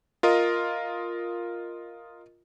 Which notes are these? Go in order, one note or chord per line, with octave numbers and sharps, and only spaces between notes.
F4 A#4 D#5